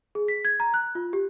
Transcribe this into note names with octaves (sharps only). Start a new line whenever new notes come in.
G#4
B6
G#6
A#5
F#6
F4
G4